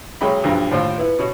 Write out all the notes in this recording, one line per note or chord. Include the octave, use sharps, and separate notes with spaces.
B1 F#3 G#3 C#4 G5 B5
B1 G2 F3 D4 A#5
D#2 A2 F4 C5 D5 F5
B3 E4 B4
B2 C#4